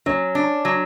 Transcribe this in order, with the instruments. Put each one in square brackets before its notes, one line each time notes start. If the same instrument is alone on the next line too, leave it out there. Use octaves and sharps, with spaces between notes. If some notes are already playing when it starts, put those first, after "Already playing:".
[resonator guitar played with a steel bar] F#3 [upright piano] C#4
[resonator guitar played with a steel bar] D4
F#3